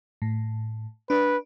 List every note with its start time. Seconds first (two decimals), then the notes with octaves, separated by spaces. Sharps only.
0.22 A2
1.10 D4 B4